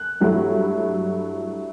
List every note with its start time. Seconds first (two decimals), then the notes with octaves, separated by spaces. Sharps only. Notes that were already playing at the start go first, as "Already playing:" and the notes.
Already playing: F#6
0.21 G2 F#3 A3 E4